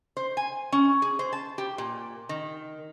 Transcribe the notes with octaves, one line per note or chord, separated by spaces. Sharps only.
C5
G#5
C#4
G#4
C5
A5
G4
A#2
D#3